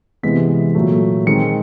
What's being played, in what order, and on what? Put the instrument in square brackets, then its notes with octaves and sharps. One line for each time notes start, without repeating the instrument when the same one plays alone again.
[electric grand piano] C3 E3 G#3 B3 B6
A#2 F#3 A3
D#3 G#3 C4 C#7